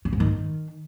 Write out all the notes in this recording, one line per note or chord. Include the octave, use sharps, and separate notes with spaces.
C#3
G#2
D#3